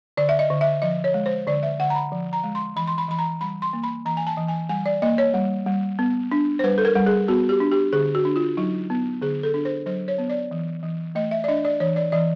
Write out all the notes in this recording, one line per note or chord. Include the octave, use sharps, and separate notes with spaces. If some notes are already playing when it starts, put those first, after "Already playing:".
D3 D5
E5
D#5
D3
E5
F3 D#5
C#5
G#3
C5
D3 D5
E5
D3 F#5
A#5
B5
F3
A#5
G#3
C6
E3 B5
C6
B5
E3 B5
A#5
G3 B5
C6
A#3
B5
E3 A#5
G#5
A5
E3
G#5
G3 G#5
D5
A#3 D#5
C#5
G3
G3
B3
D4
C5
G3 B4
A4
A#4
G3
G#4
B3 F#4
G4
D4
G4
D3 G#4
F#4
D4
F4
F#3 D#4
B3
D3 G#4
A4
D4
C5
F#3 C5
C#5
B3
D5
E3
E3
A3 D#5
E5
D5
D4 D#5
D5
E3 C#5
D5
E3 D5